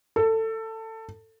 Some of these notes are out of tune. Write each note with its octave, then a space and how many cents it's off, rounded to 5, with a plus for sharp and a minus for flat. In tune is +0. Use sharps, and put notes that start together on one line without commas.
A4 +20